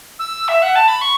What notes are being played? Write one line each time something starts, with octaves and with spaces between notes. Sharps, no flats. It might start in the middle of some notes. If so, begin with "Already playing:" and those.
E6
E5
F#5
A5
B5
C#6